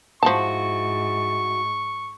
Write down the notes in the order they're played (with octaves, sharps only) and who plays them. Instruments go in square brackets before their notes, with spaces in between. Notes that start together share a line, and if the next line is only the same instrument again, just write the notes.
[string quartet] G#2 [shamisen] F3 A5 [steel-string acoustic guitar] E4 F#4 [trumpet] C#6